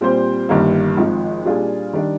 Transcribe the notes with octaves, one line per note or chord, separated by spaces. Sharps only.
A#2 G3 C4 G4 C5
G1 G2 D#3 G3 A#3
G#1 G#2 F3
A#2 G3 D4 F4 G#4
D#3 G3 D4